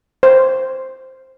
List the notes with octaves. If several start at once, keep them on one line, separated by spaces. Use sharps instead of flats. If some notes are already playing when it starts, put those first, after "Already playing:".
C5